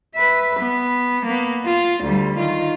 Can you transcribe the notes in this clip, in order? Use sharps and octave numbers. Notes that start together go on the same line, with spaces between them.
B4 E5
B3
A#3 B3
F4
D2 G3
D#3 F4